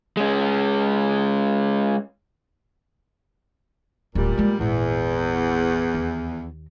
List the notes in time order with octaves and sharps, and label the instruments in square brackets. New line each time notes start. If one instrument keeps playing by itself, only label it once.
[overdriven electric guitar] G#3 C#4
[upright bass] D1 [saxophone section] A#2 G3
[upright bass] G#3 A#3
[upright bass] G#1 A#2 [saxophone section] E2
[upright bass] D#2